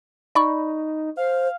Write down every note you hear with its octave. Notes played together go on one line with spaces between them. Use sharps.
D#4 D5 B5 C#6
C5 F5